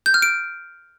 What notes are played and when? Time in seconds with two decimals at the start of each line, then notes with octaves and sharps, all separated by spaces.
0.06 G6
0.14 F6
0.22 D7